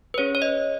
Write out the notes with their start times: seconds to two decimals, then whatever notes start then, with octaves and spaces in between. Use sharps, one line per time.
0.14 B4
0.18 C#4 G#4 C#5
0.35 C#5
0.42 D#5